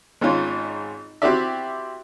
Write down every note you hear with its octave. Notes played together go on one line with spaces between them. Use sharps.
G#1 G#2 C#4 F4
C4 E4 F#4 G4 D5 E5